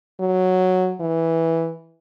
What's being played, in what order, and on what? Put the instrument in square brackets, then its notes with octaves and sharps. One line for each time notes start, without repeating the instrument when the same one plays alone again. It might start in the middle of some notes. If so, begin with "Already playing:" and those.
[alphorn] F#3
E3